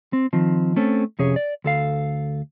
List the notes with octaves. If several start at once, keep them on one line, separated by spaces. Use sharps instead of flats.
C4
D#3 F3 C4
A3 C4 C#4 A4
F2 C3 C#4 G#4 C#5
D5
D2 A4 F5